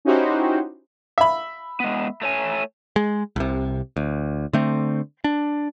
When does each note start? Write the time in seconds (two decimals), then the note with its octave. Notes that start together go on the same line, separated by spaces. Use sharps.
0.05 C#4 D#4 E4 F#4 G4 C5
1.18 E5 B5
1.80 G#3 B3
2.21 A3 C#5 G#5
2.96 G#3
3.36 C2 C3
3.96 D2
4.53 D3 A3 C4
5.24 D4